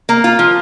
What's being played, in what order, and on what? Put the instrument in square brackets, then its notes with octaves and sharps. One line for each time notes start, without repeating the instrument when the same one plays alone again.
[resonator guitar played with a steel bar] A#3
F4
F3